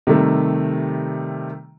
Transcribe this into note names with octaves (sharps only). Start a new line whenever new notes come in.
C3 D#3 G3 A3